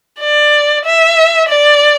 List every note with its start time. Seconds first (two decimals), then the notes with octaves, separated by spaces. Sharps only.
0.20 D5
0.85 E5
1.49 D5